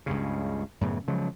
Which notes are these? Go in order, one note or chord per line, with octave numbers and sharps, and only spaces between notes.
C#2 G2 C#3
F#2 A2 C#3 B3
C#3 F3 F#3 G#3